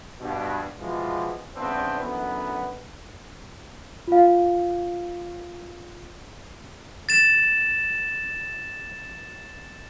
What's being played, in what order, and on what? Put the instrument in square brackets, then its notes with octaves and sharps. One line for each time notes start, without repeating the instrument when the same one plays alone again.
[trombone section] G2 B2
B2 E3 F3 G#3
E2 G2 C#3 B3 C4 D4
F#2 D3 E3 B3
[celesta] F4 F5
[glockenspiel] A6 E7